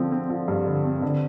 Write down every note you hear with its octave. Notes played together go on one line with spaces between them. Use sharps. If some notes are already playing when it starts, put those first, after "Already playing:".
Already playing: D3 F3 C4
C4
F3
G2
D3
C4
D3